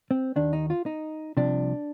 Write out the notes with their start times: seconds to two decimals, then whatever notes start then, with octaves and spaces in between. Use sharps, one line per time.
0.11 C4
0.36 D#2 D#3 D4
0.53 D#4
0.70 F4
0.86 D#4
1.37 C2 C3 F3 D4